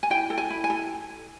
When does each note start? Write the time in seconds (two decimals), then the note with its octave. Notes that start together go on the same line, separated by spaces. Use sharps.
0.03 G#5
0.10 E4 G5
0.30 A4
0.38 G#5
0.50 E4
0.64 G#5
0.70 A4